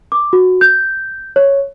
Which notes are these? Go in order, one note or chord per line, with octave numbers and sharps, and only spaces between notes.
D6
F#4
G6
C#5